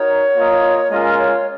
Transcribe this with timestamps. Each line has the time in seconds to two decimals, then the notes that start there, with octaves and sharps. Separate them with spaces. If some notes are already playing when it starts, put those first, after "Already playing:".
Already playing: D#4 F#4 A#4 C#5
0.36 A#3 F4 A#4 D#5
0.91 G#3 C#4 F4 A#4 D#5
1.18 C#5